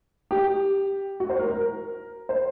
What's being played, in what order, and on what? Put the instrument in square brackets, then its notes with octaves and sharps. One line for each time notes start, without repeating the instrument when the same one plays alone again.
[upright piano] G4
F#4
C5
A#4
A#4
C5